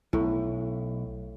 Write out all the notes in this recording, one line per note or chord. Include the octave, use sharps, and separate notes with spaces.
B1 A2